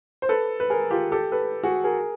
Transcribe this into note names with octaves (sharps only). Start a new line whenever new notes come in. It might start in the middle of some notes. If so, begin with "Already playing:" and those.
C5
A4 B4
B4
G#4 A#4
F4 G4
G4 A4
A4 B4
F#4 G#4
G#4 A#4